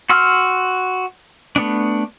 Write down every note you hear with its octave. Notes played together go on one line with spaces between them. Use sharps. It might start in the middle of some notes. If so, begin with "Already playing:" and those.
F#4 C6 E6 F6
A3 B3 D4